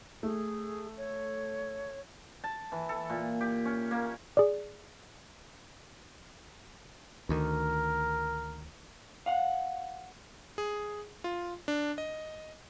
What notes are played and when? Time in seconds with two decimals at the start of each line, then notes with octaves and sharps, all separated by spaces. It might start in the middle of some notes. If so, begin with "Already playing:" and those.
0.23 A3 G#4
0.97 C#5
2.44 A5
2.72 E3
2.89 A4
3.10 A#2
3.41 G4
3.65 C#4
3.91 A#3
4.37 G#4 D5
7.29 D2 D#3 A#4
9.26 F5 F#5
10.58 G#4
11.24 F4
11.68 D4
11.98 D#5